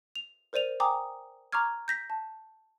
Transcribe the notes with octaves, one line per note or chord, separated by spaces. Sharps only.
F7
A#4 C5 D5 D#7 F7
G5 G#5 A#5 D6 D#6
A#5 C#6 D6 F6 G#6
G6 A#6 B6
A5